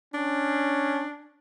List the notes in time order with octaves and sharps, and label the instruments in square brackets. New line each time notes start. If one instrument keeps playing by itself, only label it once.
[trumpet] C#4 [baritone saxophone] D4